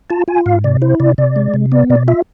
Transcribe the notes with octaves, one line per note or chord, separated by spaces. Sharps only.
F4 A5
F4 G#5
G#2 F5
C3 D5
E4 C5
C3 D5
C3 D5
G#3
C3
B3 D5
B2 D5
F4 E5